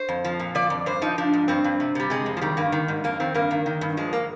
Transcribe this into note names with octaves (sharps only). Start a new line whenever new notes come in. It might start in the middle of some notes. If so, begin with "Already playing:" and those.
Already playing: C5
F2
F3
A#2
F3 D5
F2
G2 C5
F3 D#4
F3 D4
G#2
G2 C4
G2
C3
C3 G3
C3 G#3
F2
F3
D#3 G3
G2 A#3
D#3
G#2
F2 A#3
D#3 C4
G2 A#3
D#3
D#3
G2
F3 G#3
A#3